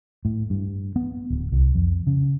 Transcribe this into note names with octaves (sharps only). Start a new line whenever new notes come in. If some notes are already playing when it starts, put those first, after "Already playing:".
A2
G2
B3
D1
C2
F2
C#3